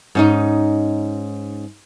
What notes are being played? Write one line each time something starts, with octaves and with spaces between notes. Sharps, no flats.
G#2 C#4 D#4